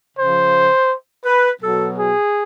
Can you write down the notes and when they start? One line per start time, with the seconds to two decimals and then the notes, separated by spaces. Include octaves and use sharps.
0.16 C#3 F3 C5
1.25 B4
1.62 B2 F#3 A4
1.98 G#4